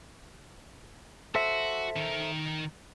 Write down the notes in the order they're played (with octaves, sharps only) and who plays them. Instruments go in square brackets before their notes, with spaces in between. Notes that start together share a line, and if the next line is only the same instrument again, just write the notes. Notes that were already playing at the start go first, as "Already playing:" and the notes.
[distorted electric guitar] F#4 [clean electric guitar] A4 C5 E5
[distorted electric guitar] D#3 A#4